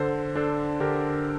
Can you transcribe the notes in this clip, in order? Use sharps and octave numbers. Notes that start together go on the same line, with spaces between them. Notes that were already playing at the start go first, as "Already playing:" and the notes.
Already playing: D3 A4 C5
D4 A4 C5
D3 G4 A#4